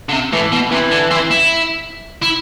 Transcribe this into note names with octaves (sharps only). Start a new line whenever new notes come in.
D3
C3
A2 E3
B2
C3 E3
D3
C4
E4
E4